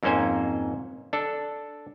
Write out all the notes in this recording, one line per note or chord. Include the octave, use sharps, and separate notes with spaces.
F2 G#2 A#3 C#4 C5 G#5
D4 A4